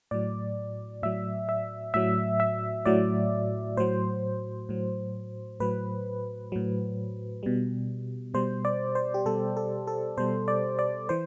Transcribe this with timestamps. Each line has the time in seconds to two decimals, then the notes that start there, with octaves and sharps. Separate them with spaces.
0.11 A2 F#3 D5
1.03 A2 F#3 E5
1.49 E5
1.94 A2 F#3 E5
2.40 E5
2.85 A2 F#3 D5
3.77 A2 F#3 C5
4.69 A2 F#3
5.60 A2 F#3 B4
6.52 A2 F#3
7.43 B2 G3
8.34 B2 G3 C5
8.65 D5
8.95 C5
9.14 G4
9.26 B2 G3 A4
9.57 A4
9.87 A4
10.17 B2 G3 C5
10.48 D5
10.79 D5
11.09 E3 C5